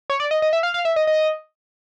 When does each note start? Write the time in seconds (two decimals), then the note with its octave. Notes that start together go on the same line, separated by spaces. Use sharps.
0.10 C#5
0.20 D5
0.31 D#5
0.42 D#5
0.53 E5
0.63 F5
0.74 F5
0.85 E5
0.96 D#5
1.07 D#5